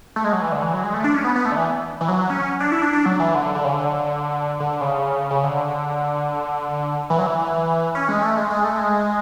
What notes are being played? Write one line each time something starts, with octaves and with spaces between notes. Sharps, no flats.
A3
G#3
F#3
E3
D3
E3
F#3
G#3
A3
D4
C#4
B3
B3
A3
D3
E3
E3
F#3
C#4
D4
E4
D4
D4
F#3
E3
D3
D3
C#3
D3
D3
C#3
C#3
D3
E3
F#3
E3
C#4
G#3
A3
G#3
G#3
A3
G#3